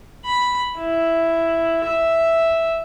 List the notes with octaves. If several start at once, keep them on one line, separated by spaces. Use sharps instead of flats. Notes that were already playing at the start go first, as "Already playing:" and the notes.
B5
E4
E5